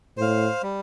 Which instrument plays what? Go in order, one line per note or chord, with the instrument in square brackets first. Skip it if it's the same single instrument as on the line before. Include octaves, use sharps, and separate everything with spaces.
[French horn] A2 [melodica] C5 F5
[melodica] G3